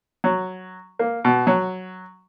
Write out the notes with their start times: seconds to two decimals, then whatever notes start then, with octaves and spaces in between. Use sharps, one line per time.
0.24 F#3
0.99 A#3
1.25 B2
1.47 F#3